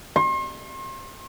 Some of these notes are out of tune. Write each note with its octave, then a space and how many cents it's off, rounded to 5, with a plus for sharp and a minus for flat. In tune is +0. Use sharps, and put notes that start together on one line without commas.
C6 +40